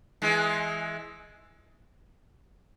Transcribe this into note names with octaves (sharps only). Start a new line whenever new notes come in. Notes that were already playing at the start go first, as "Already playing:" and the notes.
E3 G#3